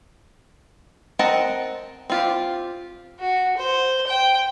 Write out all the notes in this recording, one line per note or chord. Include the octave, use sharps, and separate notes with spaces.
C4 A#4 D#5 F#5 A5
C4 F4 G4
F#4
C5
G5